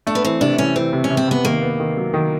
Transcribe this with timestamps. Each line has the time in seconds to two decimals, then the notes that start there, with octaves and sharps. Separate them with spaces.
0.07 A3 D4
0.15 B3
0.24 E3 C4
0.41 C3 D4
0.58 E3 C#4
0.76 E3 C4
0.93 C3
1.04 C#4
1.10 C3
1.17 C4
1.28 C3 B3
1.45 D#3 A#3
1.62 B3
1.80 D#3
1.97 F#3
2.14 D#3